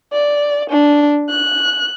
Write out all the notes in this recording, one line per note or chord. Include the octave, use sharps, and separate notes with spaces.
D5
D4
F#6